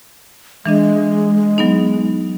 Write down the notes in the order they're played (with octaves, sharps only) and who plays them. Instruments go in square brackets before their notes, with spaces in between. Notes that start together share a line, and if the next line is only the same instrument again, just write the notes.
[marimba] E3 D4 D#5 [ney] G#3
[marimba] F#3 B3 D#4